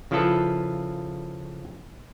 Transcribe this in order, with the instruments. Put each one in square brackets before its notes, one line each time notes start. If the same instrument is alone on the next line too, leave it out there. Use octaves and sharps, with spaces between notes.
[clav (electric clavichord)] C#3 F3 E4 F4 A4 B4